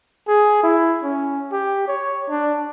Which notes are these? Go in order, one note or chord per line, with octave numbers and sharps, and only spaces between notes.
G#4
E4
C#4
G4
C#5
D4